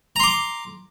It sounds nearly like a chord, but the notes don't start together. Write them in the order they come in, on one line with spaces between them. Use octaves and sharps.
A#5 C6 D6